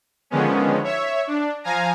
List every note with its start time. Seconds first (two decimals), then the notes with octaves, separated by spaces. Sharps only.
0.30 D3 D#3 F3 G#3 B3 C#4
0.84 C#5 E5
1.27 D4
1.64 F3 F5 G#5 A#5